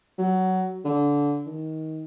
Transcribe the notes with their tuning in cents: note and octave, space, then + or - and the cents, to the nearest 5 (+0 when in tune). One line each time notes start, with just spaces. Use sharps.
F#3 +15
D3 -20
D#3 +20